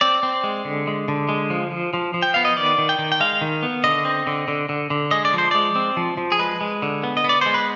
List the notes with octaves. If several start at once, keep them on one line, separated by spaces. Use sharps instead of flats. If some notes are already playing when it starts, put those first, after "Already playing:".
C4 D5
C4
G#3
D3
G#3
D3
G#3
F3
F3
F3
F3
G5
B3 F5
D#5
D#3 D5
D#3
G5
D#3
G5
G#3 F5
D#3
B3
D3 D#5
C4
D3
D3
D3
D3
G#3 D#5
D5
F3 C5
G#3 D5
C4
F3
F3
G#4
G#3 B4
G#3
D3
B3
D#5
B3
D5
G#3 C5
B4